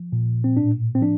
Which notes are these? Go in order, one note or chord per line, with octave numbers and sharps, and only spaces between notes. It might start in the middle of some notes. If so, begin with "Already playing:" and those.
Already playing: F3
A#2
C4
A2 D4
C4
F3 D4